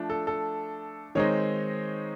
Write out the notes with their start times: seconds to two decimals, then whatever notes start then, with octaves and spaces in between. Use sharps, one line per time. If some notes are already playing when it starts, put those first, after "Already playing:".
Already playing: F3 A3 D4
0.10 A4
0.27 A4
1.15 D#3 G#3 C4 D#4 C#5